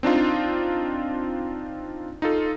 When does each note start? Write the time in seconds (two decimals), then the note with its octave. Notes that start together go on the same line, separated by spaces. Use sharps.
0.03 C4 D4 D#4 F4
2.22 D#4 F4 A4